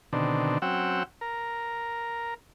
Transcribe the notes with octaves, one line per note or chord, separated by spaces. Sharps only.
B2 D3 D#3 C4 D4
F#3 C4 C#4 F#5 G5 E6
A#4